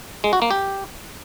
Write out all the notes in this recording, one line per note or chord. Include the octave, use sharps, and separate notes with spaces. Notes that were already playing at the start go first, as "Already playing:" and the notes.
G#3
F#4
A#3
G4